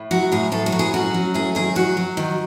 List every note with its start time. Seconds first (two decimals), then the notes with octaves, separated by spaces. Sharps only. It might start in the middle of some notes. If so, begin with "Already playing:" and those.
Already playing: A2
0.11 F#3 F#4
0.32 A2 G#4
0.52 A2 A4
0.66 F#4
0.72 F#3
0.79 G#4
0.94 C#4 F#4
1.14 F#3
1.34 A3 G#4
1.55 D#3 G#4
1.75 F#3 F#4
1.97 F#3
2.17 D#3